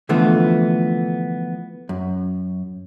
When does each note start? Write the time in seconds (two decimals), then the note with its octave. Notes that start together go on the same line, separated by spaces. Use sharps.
0.09 D3 E3 F3 A3 B3
1.89 F#2